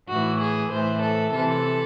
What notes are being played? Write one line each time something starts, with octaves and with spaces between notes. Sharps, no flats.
A2 E3 F#4
G#4
A2 E3 C5
A4
C3 E3 A4